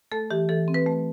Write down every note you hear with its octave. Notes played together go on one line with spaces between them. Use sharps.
A3 A4
E3 G4
E3 A4
C4
B4
A3